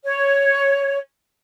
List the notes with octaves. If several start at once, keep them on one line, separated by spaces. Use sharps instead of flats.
C#5